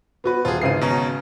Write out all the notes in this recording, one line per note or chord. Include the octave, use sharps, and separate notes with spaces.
B3 F#4 B4
D#1 F4 G#4
G#1 C#3 E3 C7 D#7
B2 C#4 A#5